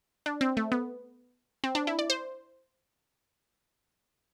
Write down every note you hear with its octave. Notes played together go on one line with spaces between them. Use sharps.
D4
C4
A3
B3
C4
D4
E4
D5
C5